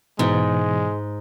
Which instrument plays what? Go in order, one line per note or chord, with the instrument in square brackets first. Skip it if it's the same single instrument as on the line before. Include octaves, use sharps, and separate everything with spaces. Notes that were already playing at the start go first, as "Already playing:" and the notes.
[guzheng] G#2 [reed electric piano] B2 E3 [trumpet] G#3